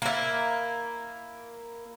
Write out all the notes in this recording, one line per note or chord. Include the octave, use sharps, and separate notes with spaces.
A#3 E4